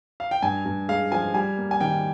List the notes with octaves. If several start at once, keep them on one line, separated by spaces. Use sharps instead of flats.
F5
G5
G2 G#5
G2
G#3 F5
F3 G#5
G3 G#5
A#3
G#5
D#3 G5